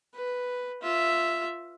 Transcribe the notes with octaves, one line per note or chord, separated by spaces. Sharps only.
B4
F4 E5